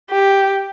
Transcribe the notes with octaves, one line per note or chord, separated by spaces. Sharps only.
G4